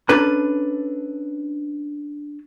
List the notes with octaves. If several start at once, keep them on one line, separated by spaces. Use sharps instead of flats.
C#4 D4 A4 B4 A#5